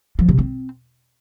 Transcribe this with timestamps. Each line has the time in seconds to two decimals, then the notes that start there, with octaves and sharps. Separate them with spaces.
0.19 F3
0.29 C3
0.39 C4